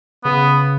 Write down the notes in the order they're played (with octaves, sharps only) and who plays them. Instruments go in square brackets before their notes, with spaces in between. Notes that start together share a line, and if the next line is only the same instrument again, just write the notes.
[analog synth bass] C#3 [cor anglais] B3